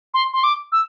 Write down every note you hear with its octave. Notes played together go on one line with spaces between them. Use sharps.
C6
C6
D6
E6